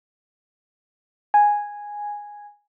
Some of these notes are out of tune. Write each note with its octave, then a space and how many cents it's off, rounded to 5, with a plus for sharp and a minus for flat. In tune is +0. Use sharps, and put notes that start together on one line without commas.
G#5 -5